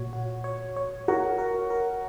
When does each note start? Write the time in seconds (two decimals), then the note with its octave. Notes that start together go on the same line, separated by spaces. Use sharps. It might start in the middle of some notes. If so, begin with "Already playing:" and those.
Already playing: A#2 F#4 C#5
0.13 F#4
0.44 C#5
0.76 C#5
1.08 F#4 A#4
1.38 A#4
1.70 A#4